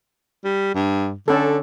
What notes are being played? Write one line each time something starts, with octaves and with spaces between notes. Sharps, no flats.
G3
G2
D3 C#4 A4